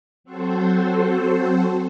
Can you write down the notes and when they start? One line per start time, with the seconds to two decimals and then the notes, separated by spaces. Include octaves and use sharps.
0.24 F#3 C4 F#4 A4 C5